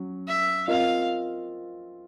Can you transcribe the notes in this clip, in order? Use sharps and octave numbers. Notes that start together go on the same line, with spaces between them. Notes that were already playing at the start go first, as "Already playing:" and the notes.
Already playing: F#3 C#4
E5
C4 F4 A#4 D#5 F5